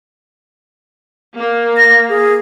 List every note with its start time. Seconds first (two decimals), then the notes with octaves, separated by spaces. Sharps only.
1.38 A#3
1.77 A#6
2.09 G#4